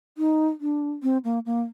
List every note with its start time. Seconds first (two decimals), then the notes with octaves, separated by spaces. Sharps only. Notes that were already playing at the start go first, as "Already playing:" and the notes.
0.18 D#4
0.61 D4
1.03 C4
1.24 A#3
1.46 A#3